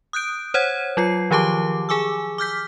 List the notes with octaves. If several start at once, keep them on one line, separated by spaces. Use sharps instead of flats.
D#6 F#6 G6 D7
C5 C#5 F#5 G#6
F#3 F4 C7
D#3 F3 G4 A5 D6
G#4 G#5 D6 E6
D6 F6 G6 B6